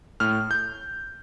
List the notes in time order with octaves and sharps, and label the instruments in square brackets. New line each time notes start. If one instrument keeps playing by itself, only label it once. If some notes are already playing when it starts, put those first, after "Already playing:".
[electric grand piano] A2 F6
G6